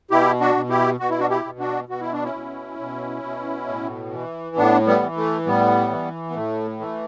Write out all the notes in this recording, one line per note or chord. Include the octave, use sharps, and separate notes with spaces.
B2 E4 G4
D4 F#4
B2
E4 G4
B2 F#4
E4
D4 F#4
E4 G4
B2
D4 F#4
B2 F#4
E4
D4
C#4 E4
B2
B2
B2
A2
E3
A2 B3 D4
G3 B3
E3
A3
A2 G3 B3
E3
B3
A2 A3
E3 A3